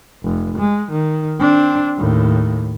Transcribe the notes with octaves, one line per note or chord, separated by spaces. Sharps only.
F1
G#3
D#3
C4 D4
D#2 A2